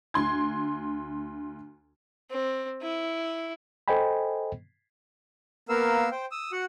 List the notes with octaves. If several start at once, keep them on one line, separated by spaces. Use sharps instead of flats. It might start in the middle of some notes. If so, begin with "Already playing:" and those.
D2 C6 G#6
C4
E4
A4 C5 D#5 G5 G#5 B5
A#3 B3 A#4 F5 E6
C5 G5
D#6 E6
F#4 F#5